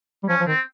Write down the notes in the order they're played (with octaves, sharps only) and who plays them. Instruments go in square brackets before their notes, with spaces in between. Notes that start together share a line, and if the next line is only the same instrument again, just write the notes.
[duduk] G3
[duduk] F3 [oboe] C#4
[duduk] F3
[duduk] D#3 [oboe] C4